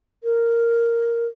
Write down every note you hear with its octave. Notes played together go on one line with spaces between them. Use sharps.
A#4